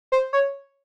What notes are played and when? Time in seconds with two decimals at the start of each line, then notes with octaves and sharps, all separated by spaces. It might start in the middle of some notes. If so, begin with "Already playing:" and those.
0.12 C5
0.33 C#5